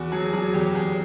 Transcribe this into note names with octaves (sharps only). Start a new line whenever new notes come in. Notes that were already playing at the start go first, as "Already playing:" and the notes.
Already playing: E2 F#4
F#3 G#4
F#3 G#4
E2 G4
E2 G#4